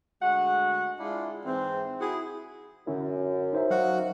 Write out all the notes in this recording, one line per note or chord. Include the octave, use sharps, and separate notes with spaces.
D2 G#3 F#4 F#5
G#3 D4 E4 F4
G#2 E3 C4
E4 F#4 G#4
F#2 D3 C#4 E4
D#4 C5 E5
F#3 F#4 D#5 F5 F#5